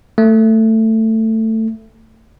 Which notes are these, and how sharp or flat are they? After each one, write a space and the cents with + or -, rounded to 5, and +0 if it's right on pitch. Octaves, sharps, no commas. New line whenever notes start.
A3 +15